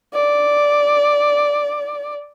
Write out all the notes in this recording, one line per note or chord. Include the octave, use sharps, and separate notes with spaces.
D5